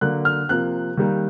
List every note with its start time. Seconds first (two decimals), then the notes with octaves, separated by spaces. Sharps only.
0.01 D3 F#3 A#3 F#6
0.25 F6
0.49 C3 F3 A#3 F#6
0.97 D#3 G3 A#3